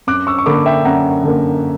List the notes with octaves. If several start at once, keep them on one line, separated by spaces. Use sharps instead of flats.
F#2 D6 F#6
C#6 E6
C#6
D3 A#3 B5 D6
E5 G5
F#2 F#5 A#5
D3 A#3